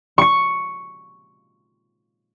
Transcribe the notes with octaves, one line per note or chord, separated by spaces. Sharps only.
C#6 C#7